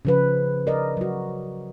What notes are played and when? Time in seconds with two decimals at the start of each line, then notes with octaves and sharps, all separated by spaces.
0.05 C#3 F3 B4
0.67 A#4 D5 D#5
0.97 F#3 F#4